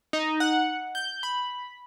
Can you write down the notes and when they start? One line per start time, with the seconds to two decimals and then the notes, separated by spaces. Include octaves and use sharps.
0.13 D#4
0.40 F#5
0.95 G6
1.23 B5